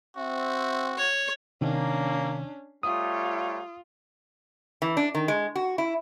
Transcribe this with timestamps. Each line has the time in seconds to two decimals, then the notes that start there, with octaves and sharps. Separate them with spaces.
0.16 C4 F#4 E5
0.97 C#5
1.61 C3 D#3 A#3 C#4 D4
2.83 G3 A3 F4 C#5 D#6
4.82 E3
4.97 D4
5.15 D#3
5.28 G#3
5.56 F#4
5.78 E4